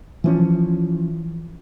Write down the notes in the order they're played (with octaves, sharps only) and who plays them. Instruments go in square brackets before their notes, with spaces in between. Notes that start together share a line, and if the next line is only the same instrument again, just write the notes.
[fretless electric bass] E3 F3 C#4